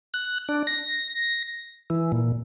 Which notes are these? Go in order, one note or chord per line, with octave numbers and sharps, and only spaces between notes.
F#6
D4
A#6
E3
A#2